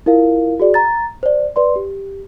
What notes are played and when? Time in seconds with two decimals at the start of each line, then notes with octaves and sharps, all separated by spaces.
0.06 E4 F4 A#4 F5
0.60 F#4 G#4 D5
0.74 A#5 A6
1.23 C5 D5
1.56 B4 D5 C6
1.76 G4